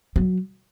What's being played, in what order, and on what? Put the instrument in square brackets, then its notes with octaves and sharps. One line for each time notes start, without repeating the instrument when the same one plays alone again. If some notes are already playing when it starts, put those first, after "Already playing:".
[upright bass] F#3